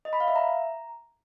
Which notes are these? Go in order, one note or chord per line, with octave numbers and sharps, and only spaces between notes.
D#5
B5
F5
E5
A#5